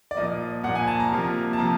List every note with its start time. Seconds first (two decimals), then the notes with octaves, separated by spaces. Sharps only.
0.11 D5
0.17 A#2 F3 A#3 D#5
0.63 A#2 F3 A#3 F#5
0.75 G#5
0.88 A5
1.00 A#5
1.11 C3 F3 A#3
1.53 A5
1.58 C3 F3 A#3 A#5